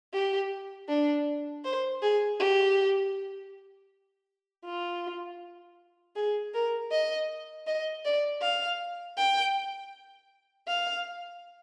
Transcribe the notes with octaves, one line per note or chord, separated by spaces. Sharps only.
G4
D4
C5
G#4
G4
F4
G#4
A#4
D#5
D#5
D5
F5
G5
F5